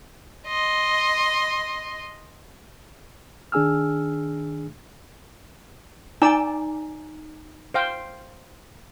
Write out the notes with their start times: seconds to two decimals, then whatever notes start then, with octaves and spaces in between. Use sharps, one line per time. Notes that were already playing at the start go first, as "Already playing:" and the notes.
0.47 D#5 C6
3.52 D#3 D4 G#4 G#5 E6 F6
6.22 D#4 D5 G5 G#5 A#5 E6
7.74 C5 F5 G5